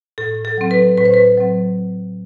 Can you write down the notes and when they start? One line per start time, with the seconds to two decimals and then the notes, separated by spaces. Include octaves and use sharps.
0.18 A2 A4
0.45 A4
0.58 F#3 C4
0.71 B4
0.98 A2 B4
1.05 C5
1.14 B4
1.38 F#3 C4